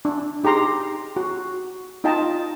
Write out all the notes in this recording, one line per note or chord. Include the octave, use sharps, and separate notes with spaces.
D4
D#4 G4 G#4 A#5 C6
F#4
D#4 F4 D#5 G5 A5 A#5